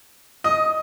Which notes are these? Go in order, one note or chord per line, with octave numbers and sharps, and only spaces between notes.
D#5 D#6